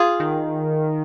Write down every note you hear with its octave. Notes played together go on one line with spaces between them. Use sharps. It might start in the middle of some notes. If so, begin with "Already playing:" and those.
Already playing: F4 G#4
D#3